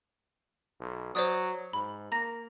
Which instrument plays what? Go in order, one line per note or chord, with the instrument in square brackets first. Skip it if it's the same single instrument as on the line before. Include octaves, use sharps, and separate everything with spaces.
[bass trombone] B1
[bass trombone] F#3 [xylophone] C5 D5 D#6
[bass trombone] G#2 [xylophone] B5
[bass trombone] A#3 [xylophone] A#5 A#6